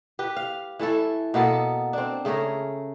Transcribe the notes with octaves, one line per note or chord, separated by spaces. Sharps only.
G4 B4
F5
E3 A3 E4 A4
B2 A#3 B3 A4
C4 D4
C#3 A3 G#4 A#4